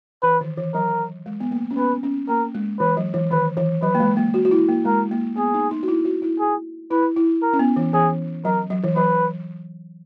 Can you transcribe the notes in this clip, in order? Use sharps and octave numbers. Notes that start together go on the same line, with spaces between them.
E3 B4
D#3
E3
F#3 A#4
G#3
B3
A#3
C#4
B3 B4
C#4
A#3 A#4
G#3
E3 B4
F#3
E3
D#3 B4
E3
F#3 B4
A#3
G#3
A#3
F#4
F#4
E4
A#3
G#3 A#4
A#3
B3 G#4
D#4
D#4
F#4
E4
F#4
E4
G#4
E4 B4
E4
A#4
C#4
B3
E3
E3 G#4
F#3 A#4
F#3
E3
F#3 B4